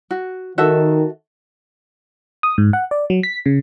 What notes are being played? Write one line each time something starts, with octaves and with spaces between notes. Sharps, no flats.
F#4
D#3 F#4 A4 E5
D#6
G#2
F#5
D5
F#3
B6
C#3